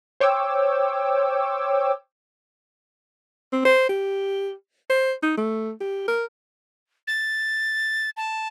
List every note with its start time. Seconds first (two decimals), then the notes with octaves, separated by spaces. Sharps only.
0.20 C5 C#5 G5 D6 E6
3.53 C4
3.65 C5
3.89 G4
4.90 C5
5.23 D#4
5.38 A3
5.81 G4
6.08 A#4
7.07 A6
8.17 A5